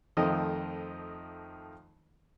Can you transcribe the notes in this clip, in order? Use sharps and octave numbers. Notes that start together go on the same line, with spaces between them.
F2 D#3 F3 A3 C5 D#5